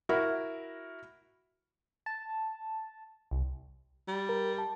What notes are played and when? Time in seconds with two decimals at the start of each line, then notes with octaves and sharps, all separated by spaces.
0.09 E4 F#4 A#4
2.06 A5
3.31 C2
4.08 G3
4.29 A#4
4.58 A5